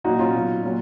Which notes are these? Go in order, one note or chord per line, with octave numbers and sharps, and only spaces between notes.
A#2 F#3 D#4 F#4
C#4 F4
B2 F#3
A#2 F#3